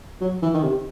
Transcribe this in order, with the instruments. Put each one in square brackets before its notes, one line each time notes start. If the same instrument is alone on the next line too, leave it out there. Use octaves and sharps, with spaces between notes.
[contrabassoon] F#3
E3
D#3
C3